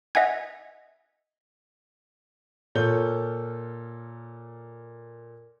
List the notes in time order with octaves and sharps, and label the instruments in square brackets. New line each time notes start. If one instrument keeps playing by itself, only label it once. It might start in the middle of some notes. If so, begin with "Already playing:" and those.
[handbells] D#5 E5 F#5 G#5 G#6
[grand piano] A#2 F4 A4 C#5 G6 G7